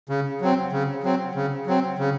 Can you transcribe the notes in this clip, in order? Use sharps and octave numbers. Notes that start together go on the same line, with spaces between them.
C#3
F#3 C4
C#3
F#3 C4
C#3
F#3 C4
C#3